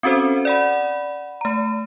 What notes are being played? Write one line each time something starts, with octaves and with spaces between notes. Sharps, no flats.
C4 C#4 F#4 A4 C5
D5 F#5 B5
A3 A#5